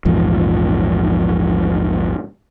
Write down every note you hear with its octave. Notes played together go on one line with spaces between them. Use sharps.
A#1 E2 G#2 F3